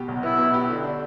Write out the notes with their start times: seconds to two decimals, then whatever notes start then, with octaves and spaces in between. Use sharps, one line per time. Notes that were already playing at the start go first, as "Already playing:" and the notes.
Already playing: B2 G4
0.08 B1
0.23 B3 E4
0.38 B2
0.54 G4
0.70 D3
0.84 D4